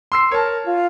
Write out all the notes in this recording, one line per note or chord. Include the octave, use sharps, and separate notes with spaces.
C6 E6 C7
A#4 C#5 A5
F4